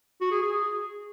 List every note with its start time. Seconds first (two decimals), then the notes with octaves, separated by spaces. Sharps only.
0.21 F#4
0.31 G#4
0.41 G#4